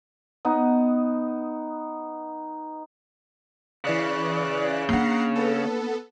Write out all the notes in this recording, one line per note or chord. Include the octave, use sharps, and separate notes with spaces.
B3 D#4
C#3 E3 D5 F#6
A#3 D4 F#5 A#5 C7
B3 A4